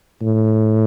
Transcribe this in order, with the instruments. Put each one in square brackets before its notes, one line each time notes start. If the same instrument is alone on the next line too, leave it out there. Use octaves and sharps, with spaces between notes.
[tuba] A2